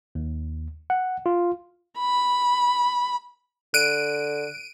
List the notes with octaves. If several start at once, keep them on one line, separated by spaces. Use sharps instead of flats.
D#2
F#5
F4
B5
D3 F#6 D7 D#7